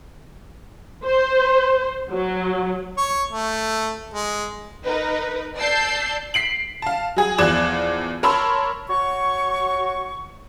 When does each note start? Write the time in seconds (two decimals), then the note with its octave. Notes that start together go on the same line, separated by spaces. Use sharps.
1.03 C5
2.10 F#3
2.97 C#5
3.32 A3
4.14 G#3
4.86 D#4 A#4 B4
5.59 D5 A5 E6 G6 C7
6.34 B6 C7 D7 F#7
6.82 F5 A5
7.16 F#3 G#4
7.38 E2 F3 D5 F#6 G#6 E7
8.23 A#4 C#5 A5 B5 C6 E6
8.89 F#4 C#5 C#6